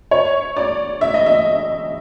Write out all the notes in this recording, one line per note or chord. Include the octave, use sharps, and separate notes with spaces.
C#5
D5
E5
D#5
E5